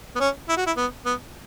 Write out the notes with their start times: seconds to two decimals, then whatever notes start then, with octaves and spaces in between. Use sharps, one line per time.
0.15 B3
0.20 C#4
0.49 E4
0.57 F#4
0.67 E4
0.77 B3
1.05 B3